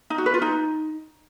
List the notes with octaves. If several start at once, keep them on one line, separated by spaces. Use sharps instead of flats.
D#4
F#4
B4
F4
D#4